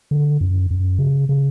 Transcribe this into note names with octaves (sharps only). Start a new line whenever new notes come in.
D3
F#2
F#2
C#3
C#3